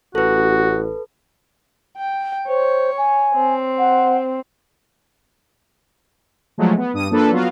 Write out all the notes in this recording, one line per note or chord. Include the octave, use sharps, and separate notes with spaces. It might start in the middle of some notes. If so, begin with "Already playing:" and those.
A1 F#4 A4 B4
G5
C5 C#5
G#5
C4
F#5
F3 F#3 G#3 A3
B3
G2 D#6 D#7
F3 A#3 D4 A4 B4
F#3 B3 F4 F#4 F5